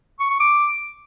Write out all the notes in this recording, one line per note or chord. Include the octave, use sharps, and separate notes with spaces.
C#6
C#6
D6